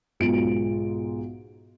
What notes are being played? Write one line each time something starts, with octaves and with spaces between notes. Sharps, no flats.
B1 G#2 B2 F4 D7